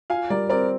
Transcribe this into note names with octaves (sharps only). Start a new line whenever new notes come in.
F4 F5 G#5
G3 A#4 D5
C4 A#4 D5